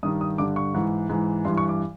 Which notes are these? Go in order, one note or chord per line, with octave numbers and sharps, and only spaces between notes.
G2 D#3 D#6
D#6
G2 D3 D6
C#6
G#2 E3
G#2 E3
G2 E3 C6
C#6
D6